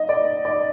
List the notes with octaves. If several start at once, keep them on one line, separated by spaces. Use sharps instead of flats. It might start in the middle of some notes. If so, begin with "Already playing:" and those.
Already playing: D#5
D5
D5